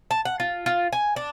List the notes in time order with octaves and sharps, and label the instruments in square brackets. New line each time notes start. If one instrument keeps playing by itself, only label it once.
[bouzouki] A5
F#5
F4
F4
G#5
D4